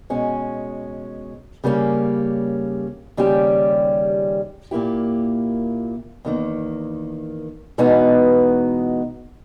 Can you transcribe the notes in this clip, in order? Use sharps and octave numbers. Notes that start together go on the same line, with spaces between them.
B2 G#3 C#4
C#3 G3 A#3 C#4
D#2 C#3 G3 C#4 G4
A#2 A#3 E4 G4
E2 D#3 A#3
E2 B2 G#3 B3 D#4